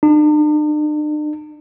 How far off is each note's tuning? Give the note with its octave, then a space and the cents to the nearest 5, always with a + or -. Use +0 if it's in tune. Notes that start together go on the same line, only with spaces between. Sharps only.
D4 +45